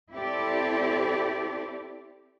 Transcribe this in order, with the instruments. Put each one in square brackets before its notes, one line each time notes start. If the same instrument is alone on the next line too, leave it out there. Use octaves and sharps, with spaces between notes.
[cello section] C4 E4 G4 A4 D5